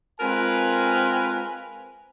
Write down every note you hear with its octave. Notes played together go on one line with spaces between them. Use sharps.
G#3 C4 F4 A#4 B4 G#5